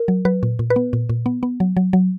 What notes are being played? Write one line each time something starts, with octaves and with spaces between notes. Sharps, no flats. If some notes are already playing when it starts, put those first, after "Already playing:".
Already playing: A#4
F#3
F#3 B4
A#2
A#2
B4
B3
A#2
A#2
B3
B3
F#3
F#3
F#3